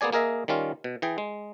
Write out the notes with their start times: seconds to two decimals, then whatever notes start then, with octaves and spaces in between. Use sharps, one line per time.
0.01 A#3 B3 G#4 D5 G#5
0.13 A#3 G#4 A#4 D#5 E5
0.48 D#3 G3 C#4 F4
0.84 B2
1.02 E3 G#4 G5
1.18 G#3